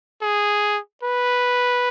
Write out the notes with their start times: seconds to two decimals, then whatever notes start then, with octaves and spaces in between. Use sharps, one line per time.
0.22 G#4
1.03 B4